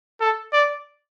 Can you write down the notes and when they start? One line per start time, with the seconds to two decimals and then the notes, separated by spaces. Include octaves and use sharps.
0.21 A4
0.53 D5